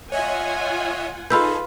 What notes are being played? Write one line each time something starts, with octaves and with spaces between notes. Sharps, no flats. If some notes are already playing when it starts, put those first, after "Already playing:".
F4 C#5 D#5 E5 F#5 G#5
D#4 F4 G#4 A4 B4 B5 E6 G6